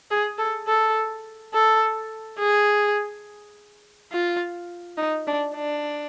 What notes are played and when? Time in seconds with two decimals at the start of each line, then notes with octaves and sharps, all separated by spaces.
0.11 G#4
0.38 A4
0.67 A4
1.54 A4
2.39 G#4
4.12 F4
4.97 D#4
5.27 D4
5.56 D4